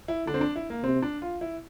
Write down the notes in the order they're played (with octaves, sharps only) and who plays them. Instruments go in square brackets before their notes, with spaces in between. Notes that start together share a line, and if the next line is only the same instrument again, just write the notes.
[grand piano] E4
[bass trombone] D3 [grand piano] D4
[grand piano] C4
D4
E4
A#3
[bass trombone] C3 [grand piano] C4
[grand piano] D4
F4
E4